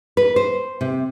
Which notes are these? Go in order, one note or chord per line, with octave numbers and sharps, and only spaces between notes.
B4
C5
C3